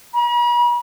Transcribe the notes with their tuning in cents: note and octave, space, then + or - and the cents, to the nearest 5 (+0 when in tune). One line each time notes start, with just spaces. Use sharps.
B5 -45